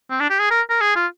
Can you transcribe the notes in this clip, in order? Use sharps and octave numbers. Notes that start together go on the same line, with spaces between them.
C4
D4
G4
G#4
A#4
A#4
G#4
F4